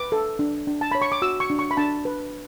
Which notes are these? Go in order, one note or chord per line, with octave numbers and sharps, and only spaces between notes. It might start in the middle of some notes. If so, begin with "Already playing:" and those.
Already playing: B4 D6
A4
D4
D4
A5
C#5 B5
C#6
D6
F#4 E6
C#6
D4
C#6
B5
D4 A5
B4